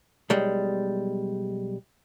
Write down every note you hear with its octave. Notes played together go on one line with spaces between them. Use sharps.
B1 G3 G#3